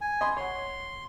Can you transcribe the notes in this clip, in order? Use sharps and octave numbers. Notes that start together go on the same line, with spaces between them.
G#5
D#5 B5 C6
C#5 F#5 C6